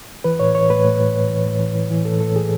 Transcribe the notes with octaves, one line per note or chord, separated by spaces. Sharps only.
E3 B4
A2 C#5
E3 C#5
A2 B4
A2
A2
A2
E3
A2
E3
E3
E3
A2 A4
A2 A4
E3 G#4